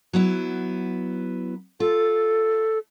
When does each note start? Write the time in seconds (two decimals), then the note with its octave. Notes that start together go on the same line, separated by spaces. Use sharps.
0.13 F#3 B3 E4
1.80 F4 A4